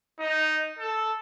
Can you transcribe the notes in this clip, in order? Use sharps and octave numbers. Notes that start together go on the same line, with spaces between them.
D#4
A4